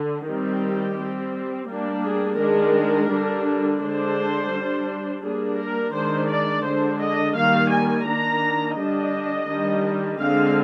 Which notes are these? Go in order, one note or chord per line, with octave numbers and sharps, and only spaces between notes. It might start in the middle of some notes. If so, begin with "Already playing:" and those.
Already playing: D3
D#3 G3 C4 G4
G3 C4
G3 A#3 D4
G#4
D#3 G#3 D4 A#4
D3 G3 D4
D3 G#3 D4 C5
G3 D4
G3 A#3 D4 G#4
A#4
D#3 G#3 D4 C5
D5
D3 G#3 D4 C5
D#5
D#3 G3 A#3 F5
G#5
D#3 A#3 D4 A#5
D3 G3 D4 D#5
D#3 G3 D4
D3 G#3 C4 F5